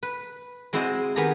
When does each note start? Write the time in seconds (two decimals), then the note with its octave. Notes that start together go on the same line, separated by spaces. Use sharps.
0.03 B4
0.73 G#3 C4 E4 F#4 C5 D#5
1.16 D#3 B3 G4 G#4 A#5